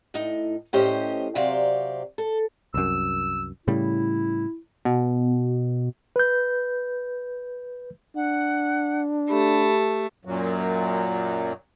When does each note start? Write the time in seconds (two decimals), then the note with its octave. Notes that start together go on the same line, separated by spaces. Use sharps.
0.14 A2 D#4
0.73 A2 C#4 G4 C5 D#5
1.35 C3 F#3 C4 G4 D5 F5
2.18 A4
2.74 C2 F#2 E6
3.68 A2 C#3 G3 E4
4.85 B2
6.16 B4 G6
8.16 D4 F#5
9.29 A3 G4 B5
10.25 F#2 A#2 F#3